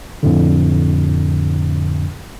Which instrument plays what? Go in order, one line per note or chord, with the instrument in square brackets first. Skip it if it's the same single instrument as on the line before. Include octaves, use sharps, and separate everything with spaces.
[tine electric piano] F2 A2 D3